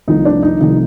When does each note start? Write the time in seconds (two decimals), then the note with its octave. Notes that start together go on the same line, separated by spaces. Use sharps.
0.08 C2 C3 F3 A3 D#4
0.25 D4
0.43 D#4
0.61 C2 C3 F3 A3 D#4